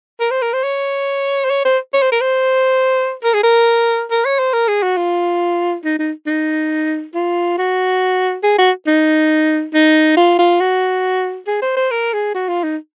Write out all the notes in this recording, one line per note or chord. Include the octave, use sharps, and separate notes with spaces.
A#4
C5
A#4
C5
C#5
C5
C#5
C5
C#5
C5
A#4
C5
A#4
G#4
A#4
A#4
C#5
C5
A#4
G#4
F#4
F4
D#4
D#4
D#4
F4
F#4
G#4
F#4
D#4
D#4
F4
F4
F#4
G#4
C5
C5
A#4
G#4
F#4
F4
D#4